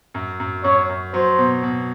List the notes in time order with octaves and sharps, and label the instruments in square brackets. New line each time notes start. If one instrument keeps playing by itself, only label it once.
[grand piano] F#2
F#2
[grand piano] F#2 [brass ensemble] C#5
[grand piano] F#2
[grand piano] F#3 [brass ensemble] C5
[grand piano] B2
B2